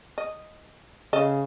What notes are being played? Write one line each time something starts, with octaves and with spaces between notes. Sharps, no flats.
D#5
C#3 A4 D#5